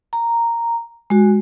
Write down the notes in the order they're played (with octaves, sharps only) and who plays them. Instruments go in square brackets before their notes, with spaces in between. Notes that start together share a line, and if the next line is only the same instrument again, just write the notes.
[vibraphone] A#5
G#3 F#4